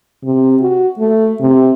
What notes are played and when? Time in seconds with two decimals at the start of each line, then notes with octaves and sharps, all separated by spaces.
0.24 C3
0.62 F#4
0.99 A3
1.40 C3